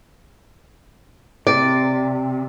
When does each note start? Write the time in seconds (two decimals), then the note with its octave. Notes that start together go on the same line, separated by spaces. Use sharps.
1.47 C3 D5